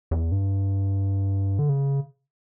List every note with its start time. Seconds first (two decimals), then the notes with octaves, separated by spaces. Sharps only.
0.11 E2
0.32 G2
1.59 D3
1.69 C#3